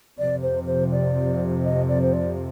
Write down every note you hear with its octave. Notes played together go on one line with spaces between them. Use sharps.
F2 C3 F3 D5
C5
C5
D5
D#5
D5
C5
D5